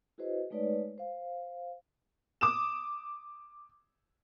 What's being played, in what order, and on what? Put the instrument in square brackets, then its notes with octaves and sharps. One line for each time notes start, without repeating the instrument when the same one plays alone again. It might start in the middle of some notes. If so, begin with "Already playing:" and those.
[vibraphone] E4 F#4 G#4 B4 C5 D#5
G#3 A3 D#4 B4 C#5 D5
C5 F5
[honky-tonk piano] D6 D#6 E7